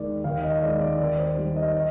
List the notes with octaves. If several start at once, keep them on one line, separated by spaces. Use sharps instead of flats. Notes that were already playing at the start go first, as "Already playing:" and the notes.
Already playing: D#2 D#3 G#3 D5
D#2 F5
D#5
D#3 G#3 D5
D5
D#2 D5
C5
D#3 G3
D#5
D#5